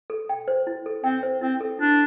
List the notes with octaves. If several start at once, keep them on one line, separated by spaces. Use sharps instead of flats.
A4
G5
C5
E4
A4
C4 G5
C5
C4 E4
A4
D4 E4